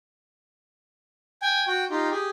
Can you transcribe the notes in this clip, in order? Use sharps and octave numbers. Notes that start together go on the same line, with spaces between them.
G5 G#5
F#4 G5
D#4 F4 G4
G4 G#4